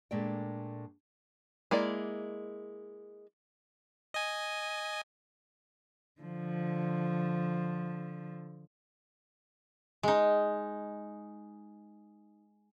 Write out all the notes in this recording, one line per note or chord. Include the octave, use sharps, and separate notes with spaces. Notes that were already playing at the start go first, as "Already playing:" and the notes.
A#2 G#3 A3 D4 D5 G5
G#3 A#3 E4 D5
D#5 G#5
D3 F3
G#3 D#4